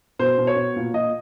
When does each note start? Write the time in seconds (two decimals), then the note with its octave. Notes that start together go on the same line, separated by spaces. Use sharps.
0.19 B2 C5
0.38 B2
0.47 C#5
0.56 B2
0.76 A#2
0.94 A#2 D#5